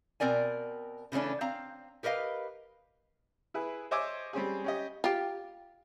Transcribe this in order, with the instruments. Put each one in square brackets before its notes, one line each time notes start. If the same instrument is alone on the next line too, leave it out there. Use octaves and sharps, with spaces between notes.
[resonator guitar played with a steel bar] B2 C4 A#4 D5 G#5
C#3 E3 A3 C#4 D4
C4 F5 A#5
G4 A#4 B4 D#5 F5
[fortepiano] E4 G#4 B4
C5 C#5 D#5 E5 G#5 D6
G3 C4 C#4 G#4
C#4 G4 D#5
[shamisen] F4 G4